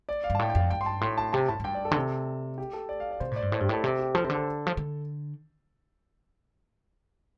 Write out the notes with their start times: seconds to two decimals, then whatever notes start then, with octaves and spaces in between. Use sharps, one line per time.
0.09 D5
0.24 F5
0.30 G2
0.35 A5
0.39 A2 G5
0.50 G5
0.55 F2 F5
0.60 G5
0.70 G2 G5
0.81 C6
0.86 A5
1.01 A2 C6
1.18 A5
1.33 C3 A5
1.49 A2 A5
1.60 A2
1.64 G2 G5
1.75 D5
1.85 A4
1.91 D3
1.96 C3
2.58 G4
2.73 A4
2.89 D5
3.00 F5
3.11 D5
3.20 C3 C5
3.31 A2 D5
3.42 G2
3.52 A2 C5
3.60 G2 G4
3.69 A2 A4
3.84 C3
3.99 G4
4.14 F3 A4
4.24 C3 C5
4.30 D3
4.35 A4
4.67 F3
4.77 D3